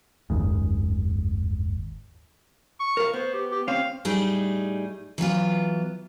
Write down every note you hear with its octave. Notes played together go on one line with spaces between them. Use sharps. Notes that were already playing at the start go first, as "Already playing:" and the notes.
F#1 D#2 G#2
C#6
A#4 F5
B3 C5
G4
G4
C4 C#4 C#5 F5
A2 G3 D#4 G#4
E3 F#3 B3 F4